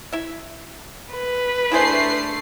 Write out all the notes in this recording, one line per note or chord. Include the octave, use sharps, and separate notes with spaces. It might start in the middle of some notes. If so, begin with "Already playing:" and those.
E4 E5
B4
A3 D4 E4 G#4 C5 C7